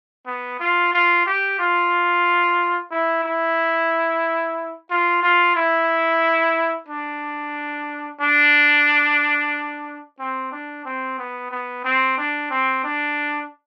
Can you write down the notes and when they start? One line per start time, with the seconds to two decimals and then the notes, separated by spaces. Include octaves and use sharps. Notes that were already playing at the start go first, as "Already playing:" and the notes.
0.27 B3
0.60 F4
0.93 F4
1.26 G4
1.59 F4
2.91 E4
3.24 E4
4.90 F4
5.23 F4
5.56 E4
6.88 D4
8.20 D4
10.19 C4
10.52 D4
10.86 C4
11.18 B3
11.51 B3
11.85 C4
12.18 D4
12.51 C4
12.84 D4